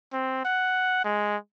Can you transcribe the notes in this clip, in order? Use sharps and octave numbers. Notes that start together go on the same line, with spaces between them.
C4
F#5
G#3